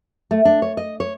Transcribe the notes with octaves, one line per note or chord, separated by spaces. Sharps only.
A3
D4
C#5
D#5
C#5